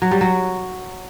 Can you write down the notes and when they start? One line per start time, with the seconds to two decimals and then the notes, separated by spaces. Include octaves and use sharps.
0.02 F#3
0.11 G3
0.21 F#3